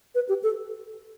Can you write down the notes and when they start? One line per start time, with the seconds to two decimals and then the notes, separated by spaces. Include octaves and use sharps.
0.15 B4
0.29 G4
0.43 A4